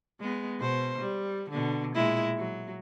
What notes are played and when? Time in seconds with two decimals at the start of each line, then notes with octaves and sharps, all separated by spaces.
0.20 G#3 B3
0.59 B2 C5
1.01 G3
1.50 B2 D3
1.95 A#2 G#3 E4
2.37 F#3